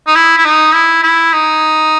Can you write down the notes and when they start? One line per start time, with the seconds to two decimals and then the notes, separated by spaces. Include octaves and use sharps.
0.07 D#4
0.15 E4
0.38 E4
0.45 D#4
0.74 E4
1.03 E4
1.33 D#4